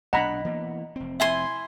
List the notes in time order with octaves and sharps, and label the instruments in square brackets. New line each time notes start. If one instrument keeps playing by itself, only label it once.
[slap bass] B1 A#2 D4 [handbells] D#5 [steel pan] F#5 A#5 B5
[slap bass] E3 A#3 B3
F1 C4
[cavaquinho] E4 G#5 C6 [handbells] E5